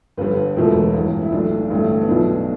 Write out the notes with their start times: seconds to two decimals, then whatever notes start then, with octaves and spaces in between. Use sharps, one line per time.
0.17 G1 G2 D3 G3 B4
0.57 E1 E2 B2 A3
0.94 A1 G2 E3
1.22 E4
1.32 B1 A2 A3 D4
1.70 A1 G2 D3 A3
2.02 B3
2.08 B1 B2 A3 D4